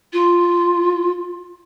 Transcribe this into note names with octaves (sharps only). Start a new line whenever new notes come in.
F4